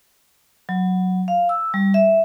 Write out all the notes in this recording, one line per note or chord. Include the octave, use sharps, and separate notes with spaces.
F#3
F5
E6
G3
E5